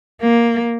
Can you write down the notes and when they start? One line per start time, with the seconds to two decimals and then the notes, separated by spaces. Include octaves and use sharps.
0.22 A#3